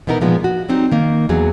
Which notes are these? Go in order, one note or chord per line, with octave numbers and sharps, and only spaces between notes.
B2 E3 B3 D#4 A#4
A#2 F3 G#3 B3
F#4
F#3 G3 C4 D#4
D#3 A#3
E2 F#3 G#4